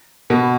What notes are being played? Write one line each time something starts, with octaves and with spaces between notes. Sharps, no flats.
B2